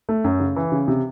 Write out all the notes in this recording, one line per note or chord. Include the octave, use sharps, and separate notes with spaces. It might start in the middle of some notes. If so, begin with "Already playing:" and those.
A3
F#2
C#3
E3
C#3
C3